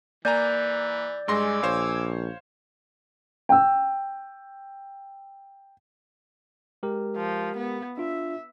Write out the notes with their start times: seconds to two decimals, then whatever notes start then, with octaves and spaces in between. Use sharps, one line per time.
0.25 E3 A#3 D5 G#5 A#5 G6
1.28 G2 G#3 G#5 C6 D6 E6 A#6
1.63 A#1 C5 C#5 F5
3.49 G5 E6
6.83 G#3 G4 A#4
7.17 F3
7.57 B3
7.98 D4 F4 E5